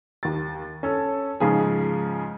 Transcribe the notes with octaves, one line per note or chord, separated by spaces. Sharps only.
D#2 A6
C#4 A4
G#2 C#3 F3 F4 G#4